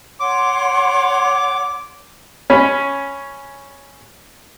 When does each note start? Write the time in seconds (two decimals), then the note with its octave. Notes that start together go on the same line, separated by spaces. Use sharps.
0.20 C#5 F#5 C6 D6
2.50 C#4 B5